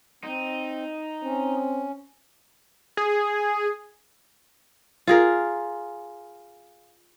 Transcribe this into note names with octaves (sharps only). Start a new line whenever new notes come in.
C4 D#4
C4 C#4
G#4
F4 G#4 A#4